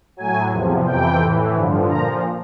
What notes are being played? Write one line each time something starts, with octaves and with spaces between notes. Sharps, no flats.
A2 F#3 G#5
E2 C3 F3
F2 C3 E3 G5
A2 E3
G2 D3 F3
A#2 F3 A#5